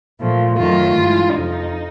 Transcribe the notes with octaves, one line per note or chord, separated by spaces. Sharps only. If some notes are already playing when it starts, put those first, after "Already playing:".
A#2 F3 A3
F#2 D#3 F#3 A3 F4
G2 E3 G#3
F2 C3 F3 D#4